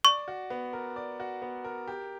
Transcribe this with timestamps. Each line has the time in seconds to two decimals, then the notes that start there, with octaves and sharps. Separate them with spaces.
0.05 D5 C#6
0.28 F#4
0.50 B3
0.73 A#4
0.96 D5
1.20 F#4
1.42 B3
1.64 A#4
1.87 G4